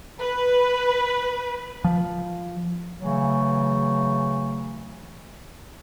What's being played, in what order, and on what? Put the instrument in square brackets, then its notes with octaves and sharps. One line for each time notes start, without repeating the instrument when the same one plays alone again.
[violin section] B4
[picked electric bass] F3
[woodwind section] C#3 E3 F#3 A3